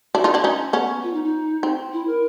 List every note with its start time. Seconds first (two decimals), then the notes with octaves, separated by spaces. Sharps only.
0.14 D4 E4 F#4
0.24 D#4 F4
0.34 D4 E4
0.44 C#4 D#4
0.73 B3 C#4
1.03 F4
1.13 D#4
1.24 D#4
1.63 C4
1.93 E4
2.07 A#4